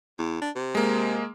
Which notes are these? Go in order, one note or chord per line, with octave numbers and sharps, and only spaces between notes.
E2
D4
C3
G#3 A#3